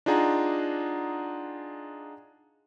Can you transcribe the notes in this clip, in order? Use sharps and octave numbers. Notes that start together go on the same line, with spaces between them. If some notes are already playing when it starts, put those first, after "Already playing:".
D4 D#4 F4 G#4 F#5 A#5